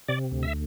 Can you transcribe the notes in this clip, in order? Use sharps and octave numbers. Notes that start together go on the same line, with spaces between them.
C3 D5
D2
E5